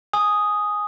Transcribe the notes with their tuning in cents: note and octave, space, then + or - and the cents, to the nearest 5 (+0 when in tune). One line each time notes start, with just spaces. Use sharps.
G#5 +0 D#6 +0